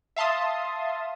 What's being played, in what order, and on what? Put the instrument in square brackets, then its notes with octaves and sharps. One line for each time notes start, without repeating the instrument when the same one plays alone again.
[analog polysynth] E5 F5 A5 C6 D#6